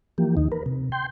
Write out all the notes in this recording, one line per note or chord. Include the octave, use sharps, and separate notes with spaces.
E3 F3 A#3 G4
D#2 D#3 D#4
A#4 B4
C3
G5 C6 G6